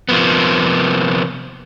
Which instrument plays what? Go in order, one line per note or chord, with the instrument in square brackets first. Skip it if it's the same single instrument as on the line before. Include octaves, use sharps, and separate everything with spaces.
[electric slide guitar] C3 F3 A#3 B3